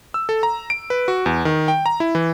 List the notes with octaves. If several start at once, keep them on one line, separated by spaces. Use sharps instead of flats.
E6
A4
A#5
D7
B4
F#4
E2
D#3
G5
A#5
E4
E3